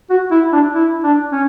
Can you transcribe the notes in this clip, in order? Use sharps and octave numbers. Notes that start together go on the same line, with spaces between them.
F#4
E4
D4
E4
D4
C#4